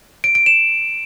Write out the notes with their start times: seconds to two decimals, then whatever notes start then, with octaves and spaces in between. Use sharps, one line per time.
0.24 D7
0.35 D7
0.46 E7